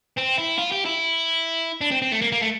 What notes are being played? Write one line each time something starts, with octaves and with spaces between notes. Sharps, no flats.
C4
E4
F4
G4
E4
D4
C4
C4
A3
A#3
A#3
A3